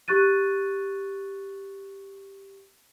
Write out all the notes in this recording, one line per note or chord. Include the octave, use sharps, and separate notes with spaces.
G4 C#6 F#6 A6 D#7